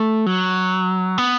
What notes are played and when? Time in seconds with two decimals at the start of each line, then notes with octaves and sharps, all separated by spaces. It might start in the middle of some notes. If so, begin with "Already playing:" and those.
Already playing: A3
0.26 F#3
1.18 B3